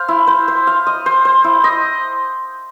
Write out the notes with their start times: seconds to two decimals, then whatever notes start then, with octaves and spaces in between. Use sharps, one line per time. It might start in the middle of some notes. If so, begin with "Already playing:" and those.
Already playing: C5 F5
0.08 E4
0.27 C5
0.48 C5
0.67 F5
0.87 D#5
1.06 C5
1.25 C5
1.44 E4
1.64 D#5